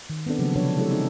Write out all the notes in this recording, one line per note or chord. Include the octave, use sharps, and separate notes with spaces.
D#3
B3 C4 D4 A4 D5
C#3 F3 F#3 A3 A#3 D4
C3 F3 G3 D4 B4 C#5
F#3 G#3 E4 G4 A4 C#5
C4 D#4 G#4 A4